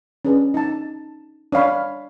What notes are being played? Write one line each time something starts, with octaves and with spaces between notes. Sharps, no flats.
C#4 D4 G#4 B4
D#4 A5
D4 C#5 F5 B5